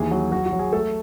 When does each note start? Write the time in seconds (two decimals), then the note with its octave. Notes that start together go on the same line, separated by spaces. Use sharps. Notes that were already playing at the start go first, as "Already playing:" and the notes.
Already playing: D#2 E3 G#4
0.11 F#3 F#4
0.32 F#3 F#4
0.46 F#4
0.53 F#3
0.59 G#4
0.73 A3 A4